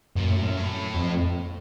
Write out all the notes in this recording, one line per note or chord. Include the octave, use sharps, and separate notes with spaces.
F#2 A#2
A2
F#2
A2
F2